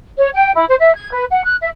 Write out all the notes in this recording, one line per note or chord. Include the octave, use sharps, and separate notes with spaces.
C#5
G5
E4
C5
E5
G#6
B4
F#5
F#6
E5